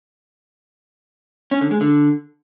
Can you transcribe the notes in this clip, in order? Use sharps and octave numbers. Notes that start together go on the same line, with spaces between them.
C#4
D3
G#3
D3